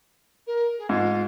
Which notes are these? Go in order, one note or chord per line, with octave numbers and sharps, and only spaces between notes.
A#4
G#4
G#2 F4